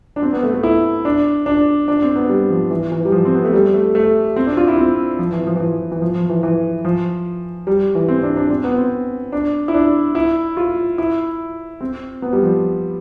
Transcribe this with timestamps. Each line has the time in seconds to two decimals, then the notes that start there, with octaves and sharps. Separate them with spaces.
0.16 D4
0.23 C4
0.33 B3
0.43 A3
0.54 A3
0.63 E4
1.05 D4
1.46 D4
1.88 D4
2.02 C4
2.16 B3
2.29 G3
2.50 F3
2.71 E3
2.92 E3
3.05 G3
3.12 F3
3.25 C4
3.34 B3
3.44 A3
3.53 G3
3.74 A3
3.95 A3
4.36 C4
4.47 D4
4.57 F4
4.67 E4
4.78 C4
5.19 F3
5.32 E3
5.47 F3
5.56 E3
5.60 F3
5.92 E3
6.02 F3
6.15 F3
6.29 E3
6.43 E3
6.85 F3
7.67 G3
7.95 E3
8.08 C4
8.23 D4
8.36 D4
8.50 C4
8.64 B3
8.78 C4
9.32 D4
9.68 E4
9.74 D4
10.15 E4
10.57 F4
10.98 E4
11.81 C4
12.22 B3
12.33 G3
12.43 F3